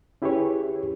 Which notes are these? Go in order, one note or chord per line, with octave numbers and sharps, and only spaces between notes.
C#4 E4 G4 G#4 B4 C#5